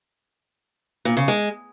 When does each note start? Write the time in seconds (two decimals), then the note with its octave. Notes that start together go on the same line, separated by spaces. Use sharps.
1.05 A#2
1.17 C#3
1.28 G#3